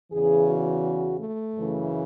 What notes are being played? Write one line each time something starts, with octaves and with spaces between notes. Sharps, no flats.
E2 C#3 E3 G#4
F#4
A3
F#2 C#3 E3